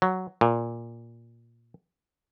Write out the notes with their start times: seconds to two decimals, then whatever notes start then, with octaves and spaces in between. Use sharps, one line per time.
0.02 F#3
0.41 A#2